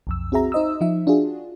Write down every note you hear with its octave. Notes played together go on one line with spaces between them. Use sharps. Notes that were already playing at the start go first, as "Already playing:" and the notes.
B1 F2 E6
C4 F#4 G#4 E5 A#5
D#4 C5 D#5 D#6 E6
F3 D#4 E5
D4 F4 F#4 G#4